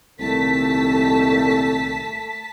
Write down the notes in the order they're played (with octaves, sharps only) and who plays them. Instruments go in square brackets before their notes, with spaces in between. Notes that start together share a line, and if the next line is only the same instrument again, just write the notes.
[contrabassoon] C2 [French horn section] A#2 D#3 A4 [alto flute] A3 [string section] A5 B6